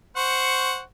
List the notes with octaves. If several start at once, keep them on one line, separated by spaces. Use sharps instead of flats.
C5 F#5 C#6